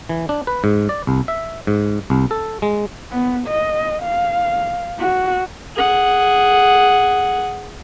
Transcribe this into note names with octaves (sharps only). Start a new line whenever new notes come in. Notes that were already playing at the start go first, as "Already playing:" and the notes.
E3
D4
B4
G#2
D5
C2
E5
G#2
C2
A4
G#3
B3
D#5
F5
F#4
G#4 F#5